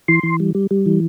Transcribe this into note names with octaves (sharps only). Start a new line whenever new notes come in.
E3 C6
E3
G3
G3
G3
E3